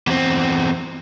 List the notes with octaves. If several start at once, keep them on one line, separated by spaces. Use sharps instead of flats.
E2 C4